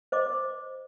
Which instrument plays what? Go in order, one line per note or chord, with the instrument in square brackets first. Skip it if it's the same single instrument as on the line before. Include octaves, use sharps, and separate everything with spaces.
[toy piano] C5 D#5 D6